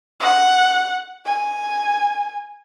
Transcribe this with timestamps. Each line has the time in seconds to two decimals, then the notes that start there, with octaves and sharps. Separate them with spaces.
0.20 F#5
1.26 G#5